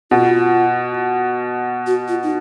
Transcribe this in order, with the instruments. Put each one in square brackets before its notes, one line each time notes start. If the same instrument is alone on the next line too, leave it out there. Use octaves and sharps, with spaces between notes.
[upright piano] B2 [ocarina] F4
[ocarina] F#4
F4
D#4